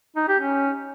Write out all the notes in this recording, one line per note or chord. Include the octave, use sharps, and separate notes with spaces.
D#4
G4
C#4